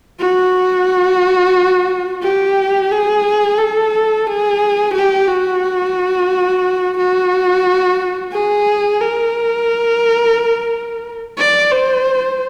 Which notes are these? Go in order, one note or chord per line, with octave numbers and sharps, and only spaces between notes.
F#4
G4
G#4
A4
G#4
G4
F#4
F#4
G#4
A#4
D5
C5